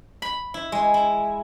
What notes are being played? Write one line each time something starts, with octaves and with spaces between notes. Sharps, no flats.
B5
E4
G#3
E4